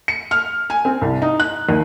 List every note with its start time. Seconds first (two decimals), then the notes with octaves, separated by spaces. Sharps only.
0.08 C#7
0.31 F6
0.70 G#5
0.85 C4
1.02 C2
1.22 D#4
1.40 F#6
1.69 D#2